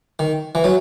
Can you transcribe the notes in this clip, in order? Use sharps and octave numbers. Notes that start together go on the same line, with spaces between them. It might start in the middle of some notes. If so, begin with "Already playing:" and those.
D#3
E3
F#3